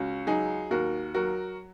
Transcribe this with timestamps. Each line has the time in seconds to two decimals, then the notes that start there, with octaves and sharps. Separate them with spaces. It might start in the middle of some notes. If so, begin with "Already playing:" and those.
Already playing: C#2 C#4 F#4
0.27 F#3 D#4 G#4
0.70 D#2 F#4 A#4
1.14 F#3 F#4 A#4